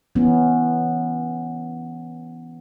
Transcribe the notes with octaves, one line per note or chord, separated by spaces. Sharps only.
E3 B3 C#4